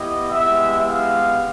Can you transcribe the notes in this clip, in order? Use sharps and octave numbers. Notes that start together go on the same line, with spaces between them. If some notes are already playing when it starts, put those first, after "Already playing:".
Already playing: B3 E4 G4 D#5
G#3 B3 E4 G4 E5
F5